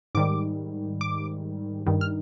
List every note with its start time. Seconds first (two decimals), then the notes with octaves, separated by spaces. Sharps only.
0.15 G#2 D#3 G3 D6
1.01 D6
1.86 G2 D#3 G3
2.01 F6